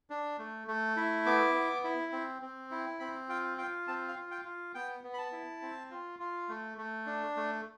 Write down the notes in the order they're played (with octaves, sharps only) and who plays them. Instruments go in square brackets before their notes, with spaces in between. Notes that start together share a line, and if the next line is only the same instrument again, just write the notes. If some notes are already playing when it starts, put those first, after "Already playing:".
[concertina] D4
A3
A3
E4
B3 D6
B3
E4
C4
C4
E4
C4 B5
F4 G5
F4 G5
C4 A5
F5
F4
G5
F4
B3 G5
B3
B5
A5
E4
C4
F4
F4
A3
A3
D4
A3